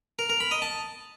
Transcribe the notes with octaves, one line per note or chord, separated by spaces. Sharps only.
A#4
A#4
B5
D#5
A5